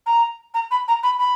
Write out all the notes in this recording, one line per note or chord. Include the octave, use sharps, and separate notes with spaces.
A#5
A#5
B5
A#5
B5
B5